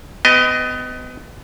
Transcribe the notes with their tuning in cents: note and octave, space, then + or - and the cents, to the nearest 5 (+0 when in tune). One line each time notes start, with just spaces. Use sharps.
B3 +30 G4 +0 D#5 +0